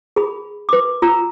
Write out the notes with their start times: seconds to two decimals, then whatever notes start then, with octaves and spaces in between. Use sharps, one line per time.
0.16 G#4 B5
0.69 B4 D6
1.02 F4 A#5 E6